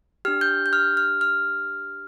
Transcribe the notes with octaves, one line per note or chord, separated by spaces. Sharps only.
D4 G4 F6
G6
G6
F6
F6
F6